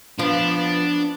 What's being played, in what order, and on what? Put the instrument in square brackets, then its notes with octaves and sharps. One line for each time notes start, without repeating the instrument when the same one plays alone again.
[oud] F3 [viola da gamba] B3 [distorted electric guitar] D4